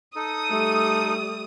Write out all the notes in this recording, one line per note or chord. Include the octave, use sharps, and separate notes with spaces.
D#4 A4 D#6
G3 A3